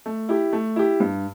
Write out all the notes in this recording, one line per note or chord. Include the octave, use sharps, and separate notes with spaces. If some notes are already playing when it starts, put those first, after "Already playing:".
A3
E4 G4
A3
E4 G4
G2